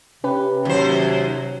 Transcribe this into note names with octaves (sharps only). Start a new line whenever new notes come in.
C3 C#4 G4 B4
D#2 F#3 C5